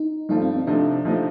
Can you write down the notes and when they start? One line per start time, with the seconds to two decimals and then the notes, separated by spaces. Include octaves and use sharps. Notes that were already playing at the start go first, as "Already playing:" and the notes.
Already playing: D#4
0.29 G2 F3 A3 D#4
0.42 C4
0.54 C4
0.67 C3 F3 A3 D4 D#4
1.05 C3 F3 A3 D#4